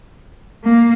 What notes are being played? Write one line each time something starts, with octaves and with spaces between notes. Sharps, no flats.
A#3